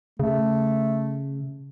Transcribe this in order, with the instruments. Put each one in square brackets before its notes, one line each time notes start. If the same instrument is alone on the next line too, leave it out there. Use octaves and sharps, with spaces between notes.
[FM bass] C#3 [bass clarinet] A3